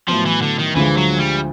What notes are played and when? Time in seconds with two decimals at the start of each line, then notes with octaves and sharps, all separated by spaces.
0.08 A2 F3 F#3 B3
0.26 E3
0.42 D3
0.59 D#3
0.75 D2 D3 E3 F3 G#3
0.97 F#3
1.19 G3